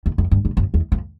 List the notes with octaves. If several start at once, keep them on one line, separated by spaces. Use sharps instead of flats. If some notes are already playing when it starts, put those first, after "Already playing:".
E2
F2
G2
G2
F#2
E2
F2